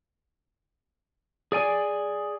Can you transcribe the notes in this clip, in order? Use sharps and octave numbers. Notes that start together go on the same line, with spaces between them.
G#4 D5 G#5